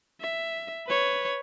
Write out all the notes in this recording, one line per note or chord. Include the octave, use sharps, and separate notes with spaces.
E5
B4 C#5